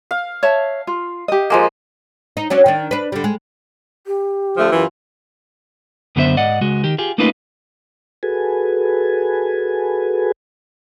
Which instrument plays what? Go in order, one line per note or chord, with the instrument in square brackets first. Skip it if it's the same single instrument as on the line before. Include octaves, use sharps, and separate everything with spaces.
[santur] F5
[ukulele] C#5 E5 A5
F4
G4 D#5
[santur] F3 G#3 A#3
[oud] D#4
F#3 C#4 D4
D#3 D4
D4 B4
D3 G3
G#3
[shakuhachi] G4
[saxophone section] D3 F3 A3
F#2 E3 F4
[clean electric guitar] F#2 D3 B3 A4 C5 E5
G#2 D5 D#5 F#5
C#2 G#3 F#4
D#3 G4
F4 G4 G#4
A3 A#3 C#4 D#4 F4 B4
[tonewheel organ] F#4 G#4 A4 B4 G#5